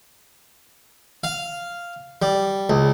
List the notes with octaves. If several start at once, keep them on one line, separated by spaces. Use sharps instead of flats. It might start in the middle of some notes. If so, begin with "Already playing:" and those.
F5
G3
C#2